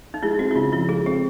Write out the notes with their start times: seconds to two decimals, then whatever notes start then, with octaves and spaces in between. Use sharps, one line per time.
0.14 D#4
0.23 G#3 E4
0.39 C4 F#4
0.51 E4
0.55 C#3 F4
0.72 F3 E4
0.89 G#3 G#4
1.06 C4 G4